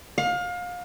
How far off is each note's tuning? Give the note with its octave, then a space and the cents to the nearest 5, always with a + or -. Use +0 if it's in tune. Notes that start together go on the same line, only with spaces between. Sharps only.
F5 +30